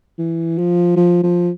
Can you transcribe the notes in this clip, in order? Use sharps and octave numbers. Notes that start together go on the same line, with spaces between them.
E3
F3
F3
F3